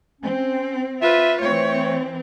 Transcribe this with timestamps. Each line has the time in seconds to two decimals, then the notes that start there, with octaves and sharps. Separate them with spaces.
0.21 C4 C#4
1.01 F4 B4 E5
1.41 E3 A3 C4 C#5